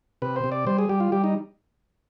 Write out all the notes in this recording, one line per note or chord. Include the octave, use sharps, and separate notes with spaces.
C3 B4
C5
C3
D5
G3 C5
G#4
G3 G4
F4
G3 G4
D#4